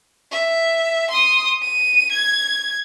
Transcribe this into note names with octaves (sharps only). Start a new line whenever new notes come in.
E5
C6 D#6
D#7
G#6